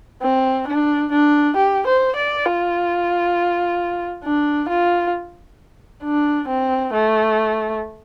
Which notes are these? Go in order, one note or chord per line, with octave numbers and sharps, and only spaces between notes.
C4
D4
D4
G4
C5
D5
F4
D4
F4
D4
C4
A3